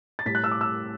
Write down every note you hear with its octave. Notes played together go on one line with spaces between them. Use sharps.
A6
A2 G3 B6
F#6
E6
D6
E6